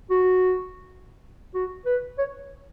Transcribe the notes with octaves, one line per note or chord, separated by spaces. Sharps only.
F#4
F#4
B4
C#5